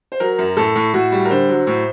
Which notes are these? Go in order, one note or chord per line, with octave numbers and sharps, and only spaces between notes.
C5
F#3 A#4
F#2
A2 A4
A2
A2 F#4
G3
A#4
D3 C5
F#3
A2